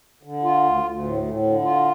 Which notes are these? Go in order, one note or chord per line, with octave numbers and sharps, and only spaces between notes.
D3
F4
D2
D2
A2
A2
D3
F4